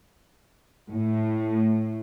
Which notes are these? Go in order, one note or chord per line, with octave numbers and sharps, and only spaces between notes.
A2